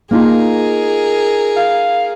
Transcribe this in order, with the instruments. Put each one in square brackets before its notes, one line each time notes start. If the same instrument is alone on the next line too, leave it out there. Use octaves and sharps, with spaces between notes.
[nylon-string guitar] A#3 D#4 F4 [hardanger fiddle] G#4 A#4
[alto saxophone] F5